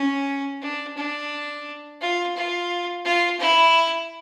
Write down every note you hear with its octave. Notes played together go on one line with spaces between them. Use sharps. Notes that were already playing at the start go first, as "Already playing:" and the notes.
Already playing: C#4
D4
D4
F4
F4
F4
E4